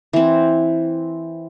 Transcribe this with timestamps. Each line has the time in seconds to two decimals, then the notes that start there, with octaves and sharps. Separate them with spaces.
0.13 E3 C4